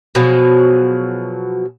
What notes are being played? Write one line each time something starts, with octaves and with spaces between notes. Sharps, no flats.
B2 F3 F#3 G#4